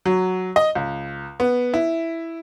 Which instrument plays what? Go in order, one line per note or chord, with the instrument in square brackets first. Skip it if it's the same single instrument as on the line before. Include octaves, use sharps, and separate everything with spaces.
[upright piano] F#3
D#5
C#2
B3
E4